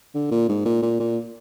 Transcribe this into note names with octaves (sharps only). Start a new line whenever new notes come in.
D3
A#2
G#2
A#2
A#2
A#2